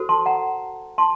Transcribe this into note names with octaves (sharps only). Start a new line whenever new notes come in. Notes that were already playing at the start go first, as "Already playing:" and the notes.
Already playing: F#4 A4 C5
A5 C6
F#5 A#5
A5 C6